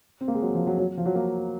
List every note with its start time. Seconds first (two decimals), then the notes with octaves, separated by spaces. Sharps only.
0.21 C4
0.28 A#3
0.35 G#3
0.42 F#3
0.55 F3
0.67 F#3
0.78 F#3
0.97 F3
1.06 F#3
1.15 A#3